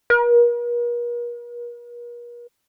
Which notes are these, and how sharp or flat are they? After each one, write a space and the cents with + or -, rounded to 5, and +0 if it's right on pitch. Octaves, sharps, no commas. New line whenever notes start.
A#4 +45